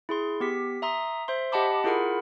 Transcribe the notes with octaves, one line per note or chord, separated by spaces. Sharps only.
E4 G#4 C6
B3 G4 B6
E5 A#5 C6 D#6
C5 E5 C6
G4 D#5 F#5 A5 B5 D6
E4 F4 G#4 A#4 F#5 B5